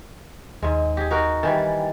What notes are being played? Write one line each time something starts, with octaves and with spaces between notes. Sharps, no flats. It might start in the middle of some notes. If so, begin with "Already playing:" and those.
D#2 G#2 G#3
G4 G#4
D#4 F#4 A#4
D#3 E3 G3 G5 G#5 A6